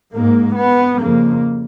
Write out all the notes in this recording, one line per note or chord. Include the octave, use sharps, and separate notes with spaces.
G#2 A#3
B3
F2 C#3 A#3